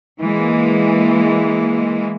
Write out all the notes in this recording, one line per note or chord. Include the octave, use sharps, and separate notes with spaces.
E3 G#3 A#3